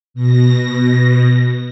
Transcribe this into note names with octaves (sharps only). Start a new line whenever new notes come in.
B2 A#6